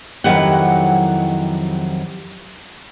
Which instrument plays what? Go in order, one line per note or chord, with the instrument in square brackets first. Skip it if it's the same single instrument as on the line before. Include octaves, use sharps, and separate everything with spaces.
[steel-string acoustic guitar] F2 D#3 F#3 E4 G4 F#5